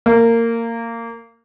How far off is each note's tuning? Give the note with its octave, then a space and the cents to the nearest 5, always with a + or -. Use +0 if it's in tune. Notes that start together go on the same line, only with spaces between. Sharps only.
A#3 -20